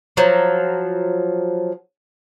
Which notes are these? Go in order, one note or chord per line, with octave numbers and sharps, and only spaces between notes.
F3 F#3